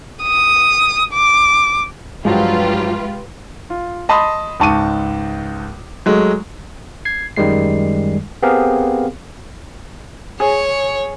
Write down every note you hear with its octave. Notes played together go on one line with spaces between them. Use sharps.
D#6
D6
G2 F3 F#3 G#3 F4 G4 B4
F4
D#5 A5 B5 C6 D#6
C#2 G#2 A5 C#6 D6 D#7
F#3 G#3 A3
G#6 C7
F#2 D#3 G3 G#3 C7
B3 C4 G4 G#4 A#4 F5
G#4 C#5